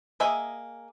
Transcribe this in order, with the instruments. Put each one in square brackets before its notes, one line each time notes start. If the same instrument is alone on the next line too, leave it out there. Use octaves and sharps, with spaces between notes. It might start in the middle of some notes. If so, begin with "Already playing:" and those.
[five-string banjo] A#3 G#4 D#5 E5 G#5